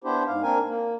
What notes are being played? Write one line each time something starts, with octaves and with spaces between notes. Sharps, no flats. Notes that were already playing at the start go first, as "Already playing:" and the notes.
B3 D4 E4 G4 C5
G#2 F5
A#3 C4 D4 A#4 G#5
A#3